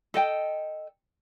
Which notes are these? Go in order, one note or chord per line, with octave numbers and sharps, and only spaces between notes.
A4 D#5 G5